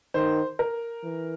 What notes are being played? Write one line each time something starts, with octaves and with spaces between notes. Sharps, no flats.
D#3 C5
A#4
E3